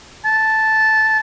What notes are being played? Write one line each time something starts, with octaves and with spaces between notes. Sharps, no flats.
A5